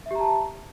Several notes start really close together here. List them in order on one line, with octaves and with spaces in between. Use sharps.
E5 G4 A#5 A5